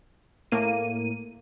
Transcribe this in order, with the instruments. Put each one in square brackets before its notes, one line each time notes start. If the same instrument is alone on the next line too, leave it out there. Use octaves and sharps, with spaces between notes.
[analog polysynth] A2 A#3 D#7